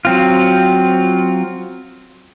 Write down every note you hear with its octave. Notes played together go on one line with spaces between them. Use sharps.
F#3 C4 F4